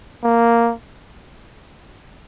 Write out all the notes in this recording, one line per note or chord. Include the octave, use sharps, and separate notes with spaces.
A#3